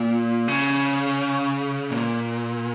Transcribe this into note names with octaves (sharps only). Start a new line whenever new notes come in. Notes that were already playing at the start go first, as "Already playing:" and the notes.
Already playing: A#2
C#3
A#2